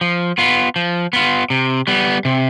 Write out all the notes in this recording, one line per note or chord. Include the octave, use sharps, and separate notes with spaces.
F3
B3 F4
F3
B3 F4
C3
G3 B3
C3